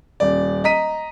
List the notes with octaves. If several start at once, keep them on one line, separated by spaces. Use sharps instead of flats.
D#1 D5
D#5 A#5 B6 D#7